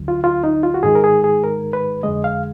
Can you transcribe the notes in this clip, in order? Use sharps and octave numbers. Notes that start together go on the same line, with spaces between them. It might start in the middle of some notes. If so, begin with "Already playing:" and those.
Already playing: D2 D3 F#3
F4
F4
D#4
F4
F#4
G#2 D#3 G#3 G#4
A#4
G#4
G#4
A#4
B4
F2 D3 G#3 D#5
F5